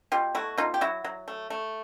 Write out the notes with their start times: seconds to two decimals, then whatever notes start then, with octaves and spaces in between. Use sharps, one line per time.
0.12 B2 F4 G4
0.35 A3 E4 F#4
0.57 B2 D#4 F4
0.74 G4
0.81 F#3 E4 F#4
1.04 F#3
1.28 A3
1.50 A3